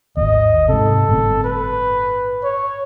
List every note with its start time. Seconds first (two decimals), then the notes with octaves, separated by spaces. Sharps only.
0.17 G#1 D#2 D#5
0.69 G#2 C3 A4
1.09 G1 A2 C4
1.44 B4
2.44 C#5